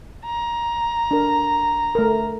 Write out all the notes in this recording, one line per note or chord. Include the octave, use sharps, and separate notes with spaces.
A#5
D4 A#4
A3 A#4